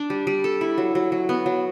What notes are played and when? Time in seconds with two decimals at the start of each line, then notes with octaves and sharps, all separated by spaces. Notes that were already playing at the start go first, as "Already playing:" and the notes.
Already playing: D4
0.10 G3
0.27 G3
0.44 A4
0.61 E4
0.78 F#3
0.95 F#3
1.12 F#3
1.29 B3
1.46 F#3